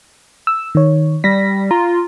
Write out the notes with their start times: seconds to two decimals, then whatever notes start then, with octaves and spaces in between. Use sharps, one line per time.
0.47 E6
0.75 D#3 C#5
1.24 G3 A#6 B6
1.71 F4 A#5